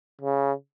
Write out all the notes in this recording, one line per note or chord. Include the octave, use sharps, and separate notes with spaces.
C#3